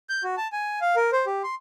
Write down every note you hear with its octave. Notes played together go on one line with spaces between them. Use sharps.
G6
F#4
A5
G#5
F5
A#4
C5
G4
C6